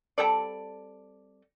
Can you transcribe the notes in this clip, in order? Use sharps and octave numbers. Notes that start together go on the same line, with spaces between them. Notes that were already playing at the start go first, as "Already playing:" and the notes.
G3 C4 A4 D5